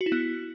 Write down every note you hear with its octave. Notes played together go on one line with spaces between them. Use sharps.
F#4
E4
B3